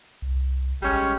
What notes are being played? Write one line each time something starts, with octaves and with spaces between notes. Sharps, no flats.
C2
A1 G3 G#3 C#4